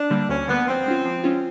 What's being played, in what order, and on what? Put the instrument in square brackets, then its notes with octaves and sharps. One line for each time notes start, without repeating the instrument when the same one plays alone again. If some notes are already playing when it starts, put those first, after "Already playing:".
Already playing: [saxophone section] D4
[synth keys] D3 G3 A#3
[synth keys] D2 [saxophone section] C#4
[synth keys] D3 G3 A#3 [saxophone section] B3
[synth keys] F3 [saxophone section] C4
[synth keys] G#3 C#4 F4
F3
G#3 C#4 F4